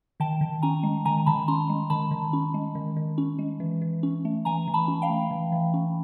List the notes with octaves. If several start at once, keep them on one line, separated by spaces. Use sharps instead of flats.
D#3 G5 A5
D#3
C#4 G#5 A#5
G#3
D#3 G#5 A#5
D#3 A5 B5
C#4 A#5 C6
G#3
D#3 A5 B5
D#3
C#4
G#3
D#3
D#3
C#4
G#3
E3
E3
C#4
A3
E3 G#5 A#5
E3
A5 B5
C#4
F5 G5
A3
E3
E3
C#4